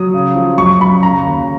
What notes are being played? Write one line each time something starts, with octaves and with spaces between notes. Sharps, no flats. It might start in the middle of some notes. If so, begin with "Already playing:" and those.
Already playing: F#3 D#6
C#3
F3
F#2 C#6
F#2 B5
C#3 A#5
D#2